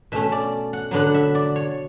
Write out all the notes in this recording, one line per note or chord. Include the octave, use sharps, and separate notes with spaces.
B2 A3 C#4 E5
D5
F#5
D3 F#3 B3 D4 F#5
E5
D5
C#5